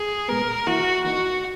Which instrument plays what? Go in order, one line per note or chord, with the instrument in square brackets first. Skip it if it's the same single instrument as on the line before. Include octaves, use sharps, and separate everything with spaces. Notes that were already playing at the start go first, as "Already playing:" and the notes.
Already playing: [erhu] G#4
[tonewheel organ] A#2 G#3 B3 [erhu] A#4
[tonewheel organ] E3 A#3 E4 [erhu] F#4
[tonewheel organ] E3 A#3 D#4 [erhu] F#4